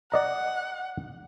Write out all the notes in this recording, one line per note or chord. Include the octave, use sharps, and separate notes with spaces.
D5 D#5 F#5 A#5